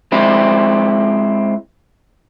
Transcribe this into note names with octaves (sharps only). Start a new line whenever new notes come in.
G#3 C4 E4